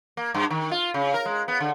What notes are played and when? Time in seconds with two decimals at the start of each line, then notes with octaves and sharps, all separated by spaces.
0.17 A#3
0.34 G2
0.50 D#3
0.71 F4
0.94 C#3
1.14 A#4
1.26 G#3
1.48 B3
1.60 D3